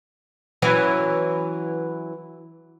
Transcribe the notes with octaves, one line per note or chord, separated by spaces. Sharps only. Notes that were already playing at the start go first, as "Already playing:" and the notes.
E3 F#3 C#4